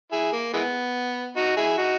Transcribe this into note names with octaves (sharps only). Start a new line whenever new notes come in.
E4 G#4
A#3
E3 G#3 B3
D#4 F#4
E4 G#4
D#4 F#4